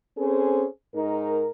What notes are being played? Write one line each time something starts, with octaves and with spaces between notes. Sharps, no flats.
C4 C#4 G#4 A4 C5
G#2 D#4 A#4